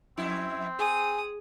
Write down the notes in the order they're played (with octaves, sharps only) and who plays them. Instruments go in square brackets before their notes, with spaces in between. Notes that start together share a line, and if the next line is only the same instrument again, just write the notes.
[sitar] F2 E4 [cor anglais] C4
[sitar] G#4 [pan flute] G#5 [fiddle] D#6